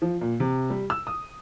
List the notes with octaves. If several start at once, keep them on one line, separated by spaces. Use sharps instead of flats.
F3
A#2
C3
G3
E6
D#6